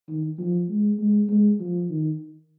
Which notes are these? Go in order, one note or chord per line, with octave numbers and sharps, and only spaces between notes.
D#3
F3
G#3
G#3
G#3
F3
D#3